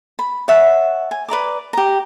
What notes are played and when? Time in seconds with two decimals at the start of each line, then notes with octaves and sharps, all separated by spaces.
0.19 B5
0.48 C#5 E5 F#5 A5
1.11 G#5
1.29 B4 D5 A#5 D6
1.73 G4 A#5